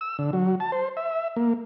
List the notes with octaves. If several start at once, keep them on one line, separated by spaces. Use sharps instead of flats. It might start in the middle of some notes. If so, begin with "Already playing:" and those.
E6
D3
F#3
A5
C5
E5
A#3